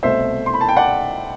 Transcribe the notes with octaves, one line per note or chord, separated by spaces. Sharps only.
C2 B2 A3 C5 E5
C6
B5
A5
G5
D5 F#5